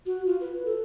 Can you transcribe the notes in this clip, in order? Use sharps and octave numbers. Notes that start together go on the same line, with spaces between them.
F#4
F4
B4
A4